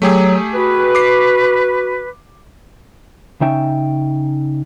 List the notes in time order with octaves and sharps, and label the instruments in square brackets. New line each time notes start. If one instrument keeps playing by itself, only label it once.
[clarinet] F#3 [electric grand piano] A3 G4 G#4
[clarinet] F#4 [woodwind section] B4
[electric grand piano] D6 C7
[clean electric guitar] C#3 C#4 D#4 E5 G5